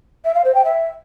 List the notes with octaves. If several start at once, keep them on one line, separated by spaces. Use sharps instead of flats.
E5
F5
C5
G5
E5